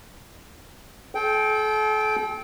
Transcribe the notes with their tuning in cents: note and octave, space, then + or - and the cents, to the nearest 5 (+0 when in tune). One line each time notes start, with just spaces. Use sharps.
A4 -40 G5 +0